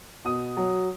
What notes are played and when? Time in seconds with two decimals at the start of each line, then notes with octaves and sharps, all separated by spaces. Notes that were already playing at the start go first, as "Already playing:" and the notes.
0.25 B2 D#6
0.57 F#3